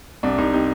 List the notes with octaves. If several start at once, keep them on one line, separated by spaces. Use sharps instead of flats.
C2 D4
C2 D#4
C3 D#4